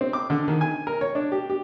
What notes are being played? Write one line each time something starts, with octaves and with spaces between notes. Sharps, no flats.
C4
D6
D3
D#3
G#5
A#4
C#5
D4
G4
G4